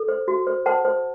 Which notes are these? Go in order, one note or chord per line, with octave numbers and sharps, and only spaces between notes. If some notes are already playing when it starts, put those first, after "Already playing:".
Already playing: A4
C5
F#4
C5
C5 F#5 A5
C5